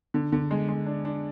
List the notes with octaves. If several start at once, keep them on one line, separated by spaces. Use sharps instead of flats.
D3
D3
G#3
G#3
D4
D4